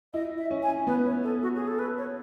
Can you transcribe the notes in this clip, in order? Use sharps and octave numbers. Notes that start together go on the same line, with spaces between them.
E4 D#5
E5
C#4
G#5
B3 B4
C#5
A4
F#4
G#4
A4
B4
C#5